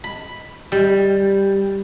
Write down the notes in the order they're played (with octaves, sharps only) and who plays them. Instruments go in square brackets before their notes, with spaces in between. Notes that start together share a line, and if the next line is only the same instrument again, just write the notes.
[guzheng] B5
G3